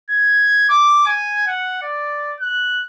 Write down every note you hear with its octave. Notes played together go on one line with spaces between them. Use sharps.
G#6
D6
G#5
F#5
D5
F#6